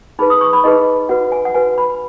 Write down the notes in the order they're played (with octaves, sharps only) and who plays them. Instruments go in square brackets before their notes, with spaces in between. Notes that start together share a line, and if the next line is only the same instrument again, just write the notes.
[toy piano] D#4 G#4 B4 B5
D#6
C#6
B5
D#4 G#4 B4 D#5
F#4 B4 F#5
G#5
F#5
F#4 B4 G#5
B5